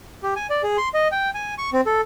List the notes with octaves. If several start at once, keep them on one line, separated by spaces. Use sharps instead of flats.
G4
G#5
D5
G#4
C6
D#5
G5
G#5
C#6
C4
A4